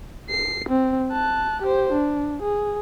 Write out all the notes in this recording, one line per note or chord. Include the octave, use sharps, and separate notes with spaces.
C7
C4
A5 F#6
G4 C5
D4
G#4